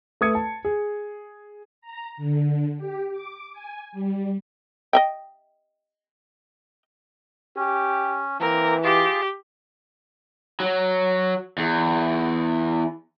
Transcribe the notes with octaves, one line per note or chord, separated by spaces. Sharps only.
A3 B4 D#6 G#6 C#7
A5
G#4
A#5
D3
G4
D6
G#5
G3
D#5 E5 G5
C#4 G4
E3 A#3 C4 A#4
F4 G4 G#4 D6
F#3
E2